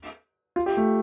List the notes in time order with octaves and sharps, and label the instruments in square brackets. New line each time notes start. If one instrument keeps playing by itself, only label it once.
[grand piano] F4
G4
A3